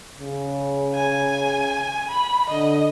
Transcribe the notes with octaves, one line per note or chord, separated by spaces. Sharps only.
C#3
G#5
B5
D3 D#5